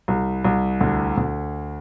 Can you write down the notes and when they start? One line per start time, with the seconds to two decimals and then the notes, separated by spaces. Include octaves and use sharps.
0.08 C2
0.45 C2
0.80 D2
1.17 D2